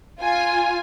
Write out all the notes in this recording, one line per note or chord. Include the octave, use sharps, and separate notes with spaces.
F4 G#5